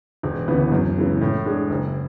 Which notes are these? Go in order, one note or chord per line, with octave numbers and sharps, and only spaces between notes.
E1
D2 C#3 E3 B3
F#2
C#3 E3 G#3
A2
G#3 D4 G#4
F#1